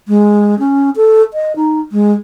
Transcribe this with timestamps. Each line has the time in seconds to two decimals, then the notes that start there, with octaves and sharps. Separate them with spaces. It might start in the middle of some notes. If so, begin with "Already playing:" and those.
0.08 G#3
0.59 C#4
0.96 A4
1.34 D#5
1.56 D#4
1.92 G#3